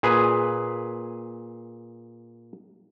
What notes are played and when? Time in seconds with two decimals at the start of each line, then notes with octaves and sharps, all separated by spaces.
0.03 A#2 G#4 B4